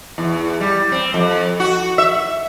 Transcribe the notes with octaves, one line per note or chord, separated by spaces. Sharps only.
E2
G3
C4
F2
F#4
E5